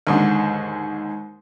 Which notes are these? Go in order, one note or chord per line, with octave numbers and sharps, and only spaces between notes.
D#2 G#2 D3